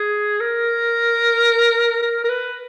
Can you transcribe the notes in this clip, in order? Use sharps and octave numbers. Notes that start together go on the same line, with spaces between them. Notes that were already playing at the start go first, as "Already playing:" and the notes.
Already playing: G#4
A#4
A#4
A#4
B4